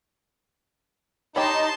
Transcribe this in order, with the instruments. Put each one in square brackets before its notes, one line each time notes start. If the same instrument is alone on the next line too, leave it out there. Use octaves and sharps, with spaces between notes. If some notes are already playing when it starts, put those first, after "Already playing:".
[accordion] D#4 [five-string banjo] G4 C#5 B5 [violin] A5 C6